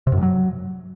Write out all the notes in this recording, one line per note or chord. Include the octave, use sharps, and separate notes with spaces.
C3
F#2
G2
F#3